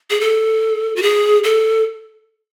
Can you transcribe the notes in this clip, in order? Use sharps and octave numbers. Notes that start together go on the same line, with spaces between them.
G#4
A4
F#4
G#4
A4